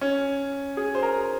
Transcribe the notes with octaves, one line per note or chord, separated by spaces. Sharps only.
C#4
G#4
C5
A#4